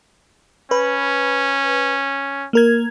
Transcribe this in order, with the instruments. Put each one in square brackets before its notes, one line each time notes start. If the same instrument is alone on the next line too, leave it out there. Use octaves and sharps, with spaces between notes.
[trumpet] C#4 [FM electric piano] B4
[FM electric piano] A#3 A#4 G#6